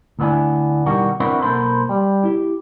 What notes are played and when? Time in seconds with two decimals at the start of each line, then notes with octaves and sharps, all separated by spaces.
0.19 D2 A2 B3 D4 E4 G#5
0.86 B2 D#3 E3 G3 F#4
1.20 C4 D4 E4 F#4 A#4 B4
1.41 B1 F2 A#3 A4 C5 B5
1.89 G3
2.24 E4 G4